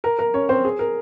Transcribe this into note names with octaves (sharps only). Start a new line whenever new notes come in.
A#4 A#5
A#4 A#5
C#4 C#5
C4 C5
G#4
A#4